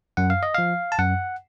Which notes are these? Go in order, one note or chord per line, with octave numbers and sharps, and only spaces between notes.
F#2 F#5
F5
D#5
F3 F5
A5
F#2 F#5